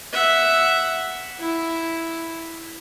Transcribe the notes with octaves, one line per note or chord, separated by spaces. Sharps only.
E5 F#5
E4